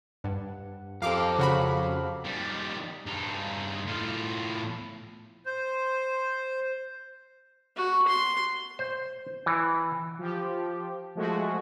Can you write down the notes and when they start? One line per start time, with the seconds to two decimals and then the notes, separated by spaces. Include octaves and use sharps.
0.24 G2 F#5
1.02 F2 C4 G4 A4 A#4 F5 D6
1.39 C#3 F#4 F5 B5
2.25 D#3 G3
3.06 G2 D#4
3.87 A2 F4
5.46 C5
7.76 F#4
8.08 C6
8.79 C5
9.46 E3
10.19 F3 G4
11.15 F3 G#3 A3 F#4